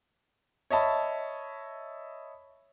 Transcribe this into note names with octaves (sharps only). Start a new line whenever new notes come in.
C#5 D#5 E5 A5 B5